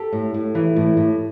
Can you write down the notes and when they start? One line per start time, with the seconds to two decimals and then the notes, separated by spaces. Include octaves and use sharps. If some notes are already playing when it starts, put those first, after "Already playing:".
Already playing: G4 A4
0.13 A2
0.34 A2
0.55 E3
0.76 A2
0.97 A2